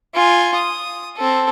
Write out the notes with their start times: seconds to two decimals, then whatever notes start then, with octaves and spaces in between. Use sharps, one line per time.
0.15 F4 G#5
0.55 D#6
1.17 C4 A4